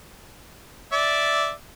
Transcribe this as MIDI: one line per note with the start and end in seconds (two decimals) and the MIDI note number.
0.92 1.51 74
0.92 1.51 76